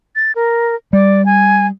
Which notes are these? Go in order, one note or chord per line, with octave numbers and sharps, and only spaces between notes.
A6
A#4
G3 D5
G#5